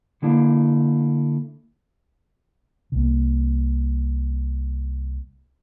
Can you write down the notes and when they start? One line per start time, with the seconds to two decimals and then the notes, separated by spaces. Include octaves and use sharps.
0.22 D3 A3 A#3 D4 E4
2.92 C2 A#3